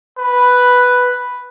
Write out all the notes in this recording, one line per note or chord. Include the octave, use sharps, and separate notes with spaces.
B4